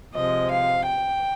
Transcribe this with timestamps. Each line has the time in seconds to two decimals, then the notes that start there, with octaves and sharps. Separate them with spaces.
0.15 C3 F3 G#3 D#5
0.50 F5
0.86 G5